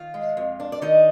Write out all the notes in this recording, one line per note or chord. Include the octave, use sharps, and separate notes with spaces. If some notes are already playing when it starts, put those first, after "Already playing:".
Already playing: D#3 F4 F5
G#3
F2
D4
D5
D#3 D#4 D#5